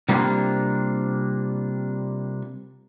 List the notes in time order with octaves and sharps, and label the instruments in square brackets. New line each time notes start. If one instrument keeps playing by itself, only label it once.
[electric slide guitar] C3 G3 A#3 D4 F4